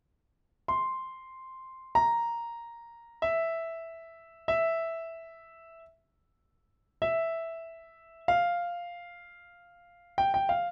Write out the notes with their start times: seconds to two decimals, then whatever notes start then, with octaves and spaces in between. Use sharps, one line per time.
0.68 C6
1.95 A#5
3.22 E5
4.48 E5
7.02 E5
8.28 F5
10.18 G5
10.34 G5
10.49 F5